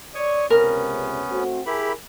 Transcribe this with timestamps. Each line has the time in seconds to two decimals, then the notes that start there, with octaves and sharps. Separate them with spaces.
0.15 C#5 D5 C#6 D#6
0.50 C#2 C3 B3 C#4 A#4
1.30 A3 C4 F#4
1.66 E4 G4 G#4 A#4 B5